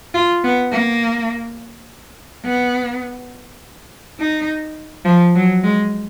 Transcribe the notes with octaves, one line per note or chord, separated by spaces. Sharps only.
F4
B3
A#3
B3
D#4
F3
F#3
G#3